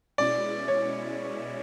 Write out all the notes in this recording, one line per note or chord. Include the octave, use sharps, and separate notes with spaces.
B2 G#3 C#4 E4 D5
C#5